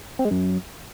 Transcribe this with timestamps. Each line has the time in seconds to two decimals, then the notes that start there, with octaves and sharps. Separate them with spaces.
0.19 C4
0.25 G#3
0.31 F#2